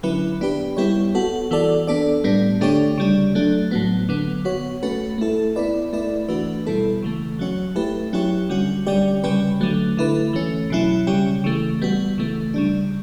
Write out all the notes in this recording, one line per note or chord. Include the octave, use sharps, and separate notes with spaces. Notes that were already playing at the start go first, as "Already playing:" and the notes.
D3 F#3 C#4 E4 B4
B3 D4 G4 B4
G3 B3 E4 G4 C#5
B3 F#4 A4
E3 B3 F#4 A4 D5
B3 D4 A4 D5
A2 G3 B3 D4
D3 A3 D4 G4 C#5
C#3 G3 D4
F#3 A3 D4
A2 F#3 B3
D3 F#3 B3
B3 F#4 C#5
A3 C#4 F#4 B4
A3 E4 A4
B3 E4 B4 D5
A3 E4 B4 D5
E3 A3 D4 F#4 B4
B2 G3 B3 E4 A4
C#3 E3 A3
F#3 C#4 F#4 C#5
A3 E4 G4 B4
F#3 C#4 E4 G4 C#5
D3 G3 C#4 F#4
D3 G3 C#4 G4 D5
C#3 G3 C#4 G4 B4
D3 F#3 A3
D3 A3 E4 B4
E3 A3 C#4
B2 F#3 C#4 E4
C#3 G3 C#4 G4
C#3 E3 A3
G3 B3 F#4
C#3 E3 A3
C#3 G3 D4